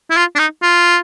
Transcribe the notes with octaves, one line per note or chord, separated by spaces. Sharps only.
E4
F4
D4
D#4
F4